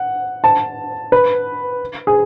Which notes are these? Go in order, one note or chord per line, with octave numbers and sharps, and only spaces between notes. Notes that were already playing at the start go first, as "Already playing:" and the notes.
Already playing: F#5
A5
B4
G#4